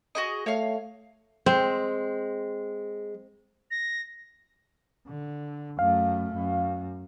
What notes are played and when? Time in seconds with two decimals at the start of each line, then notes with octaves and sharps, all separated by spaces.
0.15 F#4 G#4 D#5
0.46 A3 C#5 F5
1.46 G#3 C4
3.71 A#6
5.08 D3
5.79 F#2 A3 F5
6.34 F#2